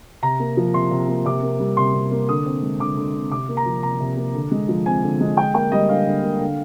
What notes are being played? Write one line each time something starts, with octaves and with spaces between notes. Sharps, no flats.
C3 A#5
A#3
F3
C3 C6
C3
A#3
C3 D6
A#3
G3
C3 C6
C3
A#3
D3 D#6
C4
G#3
D3 D6
D3
C4
C3 D6
A#3
A#5
F3
C3 A#5
C3
A#3
D3
G#3
F3
C4 G#5
D3
G#3
D3 G5
A#3 G5
G3 D#5
D3 F5
D3
A#3
D3